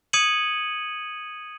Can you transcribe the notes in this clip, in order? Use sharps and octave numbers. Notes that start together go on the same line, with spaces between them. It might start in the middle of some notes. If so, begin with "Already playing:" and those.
D#6 G#6 C#7 D#7 F#7